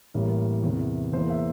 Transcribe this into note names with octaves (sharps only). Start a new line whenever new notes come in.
A1 A2 G3 A#3 A#4
E2 C3 E3
E2 E3 A#3 C5
E5